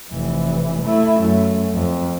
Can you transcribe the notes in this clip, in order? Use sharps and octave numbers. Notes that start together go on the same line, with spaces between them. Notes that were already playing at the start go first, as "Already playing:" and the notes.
F1 E3
A3 E4
F#2 A3
F2